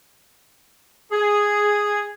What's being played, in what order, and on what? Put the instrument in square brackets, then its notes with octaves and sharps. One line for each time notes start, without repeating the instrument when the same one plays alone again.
[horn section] G#4